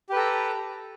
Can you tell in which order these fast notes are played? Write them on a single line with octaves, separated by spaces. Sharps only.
G4 B4 A4 A#5